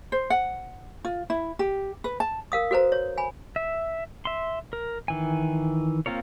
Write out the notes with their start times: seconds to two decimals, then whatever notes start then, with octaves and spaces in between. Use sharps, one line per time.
0.12 C5
0.30 F#5
1.05 F4
1.30 E4
1.59 G4
2.04 B4
2.20 A5
2.52 A#4 F5 D#6
2.71 F#4 A4 B4 C5 A#5
2.92 C#5
3.18 G#5 B5
3.56 E5
4.25 E5 C6
4.73 A#4
5.08 D#3 E3 G#5
6.06 A#3 C4 F4 A#4 C#5